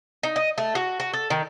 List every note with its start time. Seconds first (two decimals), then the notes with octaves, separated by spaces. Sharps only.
0.23 D#4
0.36 D#5
0.58 A3
0.75 F#4
1.00 F#4
1.13 A4
1.30 D#3